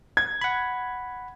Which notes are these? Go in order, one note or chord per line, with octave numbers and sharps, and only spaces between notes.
G#6
F#5 B5